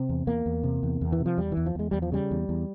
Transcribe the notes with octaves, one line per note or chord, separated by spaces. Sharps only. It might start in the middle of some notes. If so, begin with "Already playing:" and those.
Already playing: C3 C4
E2
E2 A#3
E2
C3
E2
E2
E3
C3
F3
E2 G3
E3
E2
F3
E2 G#3
E2 G3
F3
C#3 G3
E2
E2